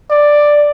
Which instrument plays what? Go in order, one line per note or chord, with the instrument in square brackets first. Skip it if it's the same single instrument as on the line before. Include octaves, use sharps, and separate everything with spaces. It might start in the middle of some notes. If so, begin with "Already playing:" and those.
[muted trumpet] D5